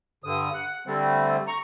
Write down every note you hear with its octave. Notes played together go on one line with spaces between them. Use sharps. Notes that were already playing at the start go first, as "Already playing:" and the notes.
G2 D3 D#6
F#5
D3 G3 A3 C4
A#5 C#6